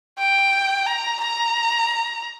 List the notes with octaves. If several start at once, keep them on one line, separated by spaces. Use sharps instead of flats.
G5
A#5
A#5